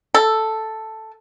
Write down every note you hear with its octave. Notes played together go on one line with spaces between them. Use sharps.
A4